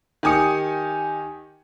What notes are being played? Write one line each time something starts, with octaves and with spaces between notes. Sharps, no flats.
D#3 G4 G#5 D#6 C#7